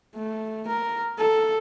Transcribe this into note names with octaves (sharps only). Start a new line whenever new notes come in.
A3
A#4
A4